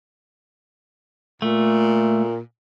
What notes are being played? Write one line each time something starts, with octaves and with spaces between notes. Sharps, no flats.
A#2 A3